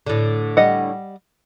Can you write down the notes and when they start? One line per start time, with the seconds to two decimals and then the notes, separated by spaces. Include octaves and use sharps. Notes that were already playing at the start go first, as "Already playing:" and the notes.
0.06 A2 D3
0.57 G3 D#5 F#5